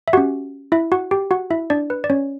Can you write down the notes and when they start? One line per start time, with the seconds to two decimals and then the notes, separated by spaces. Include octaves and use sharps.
0.08 E5
0.13 C#4 F#4 G4 F#5
0.72 E4 E5
0.92 F#4 F#5
1.11 G4 G5
1.31 F#4 F#5
1.50 E4 E5
1.70 D4 D5
1.90 B4
2.04 D5
2.10 C#4 C#5